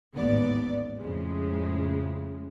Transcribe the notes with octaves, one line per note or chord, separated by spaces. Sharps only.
A1 D#2 G#2 B3 D5
F2 A2 C#3 G#3